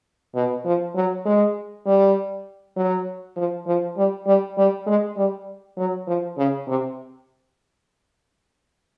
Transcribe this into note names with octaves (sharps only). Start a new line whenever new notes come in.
B2
F3
F#3
G#3
G3
F#3
F3
F3
G3
G3
G3
G#3
G3
F#3
F3
C#3
C3